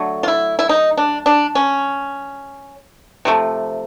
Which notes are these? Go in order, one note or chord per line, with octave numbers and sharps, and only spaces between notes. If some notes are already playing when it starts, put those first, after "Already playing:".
Already playing: D3 F#3 A3
F4
E4
E4
D#4
D4
D4
C#4
C3 F3 A3